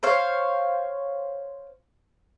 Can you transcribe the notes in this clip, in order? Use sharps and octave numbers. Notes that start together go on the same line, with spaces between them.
C5 C#5 F5